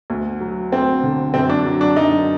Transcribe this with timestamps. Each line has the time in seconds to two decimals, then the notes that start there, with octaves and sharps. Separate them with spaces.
0.10 D2
0.41 F#3
0.72 D2 C4
1.03 D3
1.34 F#2 C4
1.50 D4
1.65 F#3
1.81 D4
1.96 F#2 D#4